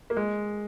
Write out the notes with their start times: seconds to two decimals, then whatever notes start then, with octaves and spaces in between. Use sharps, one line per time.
0.10 A#3
0.17 G#3